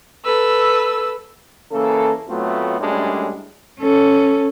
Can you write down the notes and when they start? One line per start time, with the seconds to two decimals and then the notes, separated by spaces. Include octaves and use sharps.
0.25 A4 B4 E6
1.72 C#3 E3 A#3 A4
2.28 A2 F#3 A3 B3 C4 F4
2.79 F#2 A2 G3 G#3 D4
3.80 C#4 A4